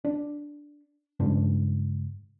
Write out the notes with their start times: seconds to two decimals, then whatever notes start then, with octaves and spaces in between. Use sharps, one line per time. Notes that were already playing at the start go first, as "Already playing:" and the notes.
0.05 D4
1.20 G2 C#3 G#3 D4